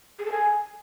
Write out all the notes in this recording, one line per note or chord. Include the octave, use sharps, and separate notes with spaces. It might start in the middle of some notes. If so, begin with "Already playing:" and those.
G#4
A4
G#5